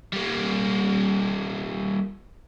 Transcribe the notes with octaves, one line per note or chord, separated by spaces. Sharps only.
G3 A#3